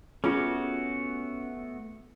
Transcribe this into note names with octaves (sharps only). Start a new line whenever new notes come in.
A3 B3 C#4 F4 F#4 G#4